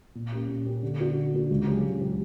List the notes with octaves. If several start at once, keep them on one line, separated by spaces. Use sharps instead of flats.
A#2
A#3 C#4 G4
A#2
A#3 C#4 G4
D3
A#3 D4 F#4
D3
A#3 D4 F#4
C#2
C#3 F#3 C#4 G4
C#2
C#3 F#3 C#4 G4